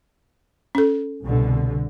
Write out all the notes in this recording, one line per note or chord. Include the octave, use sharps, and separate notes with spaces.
C#4 A4
C2 B2 D3